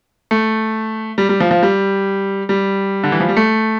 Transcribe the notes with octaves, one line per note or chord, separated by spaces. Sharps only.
A3
G3
G3
F3
F3
G3
G3
D3
E3
F3
G3
A3